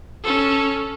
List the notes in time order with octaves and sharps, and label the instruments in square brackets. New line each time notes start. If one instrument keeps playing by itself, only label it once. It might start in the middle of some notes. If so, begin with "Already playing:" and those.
[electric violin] C#4 A4